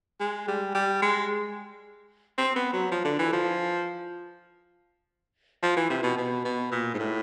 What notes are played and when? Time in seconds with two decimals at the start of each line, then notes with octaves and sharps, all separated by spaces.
0.20 G#3
0.48 G3
0.75 G3
1.02 G#3
2.38 C4
2.56 B3
2.73 F#3
2.92 F3
3.05 D3
3.19 E3
3.33 F3
5.63 F3
5.77 E3
5.90 C3
6.03 B2
6.18 B2
6.45 B2
6.72 A#2
6.94 G#2
6.99 A2